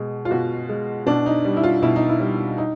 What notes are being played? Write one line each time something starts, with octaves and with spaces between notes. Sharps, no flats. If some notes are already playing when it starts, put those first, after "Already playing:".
Already playing: B2 G#3
F4
B2 F#4
G#3
B2 D4
D#4
G3
E4
F4
B2 E4
D#4
E4
G3
D#4